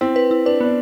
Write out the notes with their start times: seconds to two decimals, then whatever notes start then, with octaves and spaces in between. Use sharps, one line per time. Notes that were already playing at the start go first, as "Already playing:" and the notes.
0.01 C4 E4
0.16 B4
0.31 E4
0.46 D4 B4
0.61 B3 D4